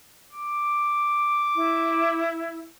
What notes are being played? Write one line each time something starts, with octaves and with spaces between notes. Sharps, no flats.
D6
E4